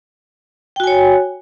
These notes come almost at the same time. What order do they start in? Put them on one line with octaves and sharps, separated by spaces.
G5 F#4 G#5 C#5